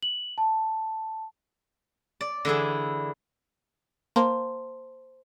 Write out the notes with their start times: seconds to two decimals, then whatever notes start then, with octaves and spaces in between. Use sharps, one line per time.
0.03 F#7
0.38 A5
2.21 D5
2.45 D3 E3 E4 G#4
4.16 A#3 C5 A5 C6